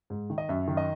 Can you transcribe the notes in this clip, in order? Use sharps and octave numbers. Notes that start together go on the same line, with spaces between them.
G#2
D#3
D#5
F#2 E5
D#3
D#5